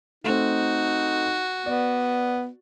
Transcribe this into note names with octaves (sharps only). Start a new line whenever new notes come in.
A3 C4 D#4 F#4
B3 D5